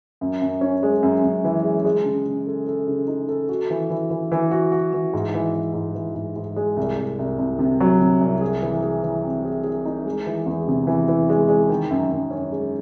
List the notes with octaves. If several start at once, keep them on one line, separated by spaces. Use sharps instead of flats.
F#2
F#2
C#4
G#3
F#2
F#2
E3
G#3
G#3
C#3
C#3
A4
A4
C#3
D#4
A4
F#4
E3
E3
E3
E3
F#4
F#4
E3
G#2
E3
E3
G#2
E3
G#2
G#2
G#3
C2
C2
C2
C2
C3
F#3
C3
C2
G#4
E3
G#4
E3
C4
G#4
G#4
D#4
G#3
E3
E2
C3
E3
E3
G#3
G#3
D#3
F#2
F#2
C#4
G#3